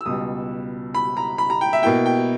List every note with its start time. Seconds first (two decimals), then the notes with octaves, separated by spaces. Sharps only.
0.01 E6
0.05 C#2 B2 G3 D#6
0.95 B5
1.17 A#5
1.38 B5
1.50 A#5
1.61 G5
1.73 E5
1.83 B2 A#3 E4 G5
2.06 G5